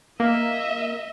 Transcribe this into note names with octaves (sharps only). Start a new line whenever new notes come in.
A#3 D#5 E5